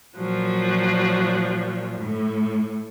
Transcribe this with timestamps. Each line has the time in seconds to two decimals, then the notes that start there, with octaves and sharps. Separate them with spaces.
0.16 A#2 F3 F#3
1.99 A2